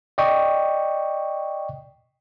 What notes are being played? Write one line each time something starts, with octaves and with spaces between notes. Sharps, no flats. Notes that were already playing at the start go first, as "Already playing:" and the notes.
D5 D#5 G5 C#6